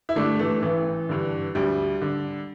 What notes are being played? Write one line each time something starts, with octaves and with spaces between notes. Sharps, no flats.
E4
G2 D3 A3 D4
E3 A3
A1 E3
G2 D3
D2 G3
D3